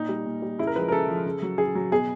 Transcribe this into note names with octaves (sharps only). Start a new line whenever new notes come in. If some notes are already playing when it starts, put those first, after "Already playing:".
Already playing: A#2 D#4
G3
A#2
G3
C#3 E4
A#4
F3 G#3 B4
A#4
C#3 A4
F3 G#3
C#3
F#3
C#3 G#4
F#3
B2 G#4